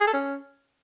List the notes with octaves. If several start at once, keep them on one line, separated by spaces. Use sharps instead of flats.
G#4
A4
C#4